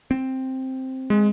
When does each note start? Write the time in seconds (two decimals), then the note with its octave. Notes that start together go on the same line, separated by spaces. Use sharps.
0.11 C4
1.10 G#3